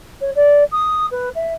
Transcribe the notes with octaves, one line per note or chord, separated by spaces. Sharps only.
C#5
D5
D#6
B4
E5